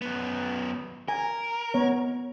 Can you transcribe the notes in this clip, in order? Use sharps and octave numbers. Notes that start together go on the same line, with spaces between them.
F#2 B3
A#4 G#5
B3 C#5